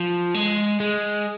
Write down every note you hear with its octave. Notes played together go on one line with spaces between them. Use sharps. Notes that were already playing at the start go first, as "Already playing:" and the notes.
Already playing: F3
G#3
G#3